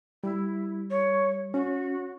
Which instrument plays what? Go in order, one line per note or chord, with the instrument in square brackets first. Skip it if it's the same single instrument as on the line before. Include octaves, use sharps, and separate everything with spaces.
[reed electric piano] G3 [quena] E4
[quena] C#5
[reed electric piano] C#4 [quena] F#4